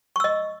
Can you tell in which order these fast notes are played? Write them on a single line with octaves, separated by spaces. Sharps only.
C#6 E6 D#5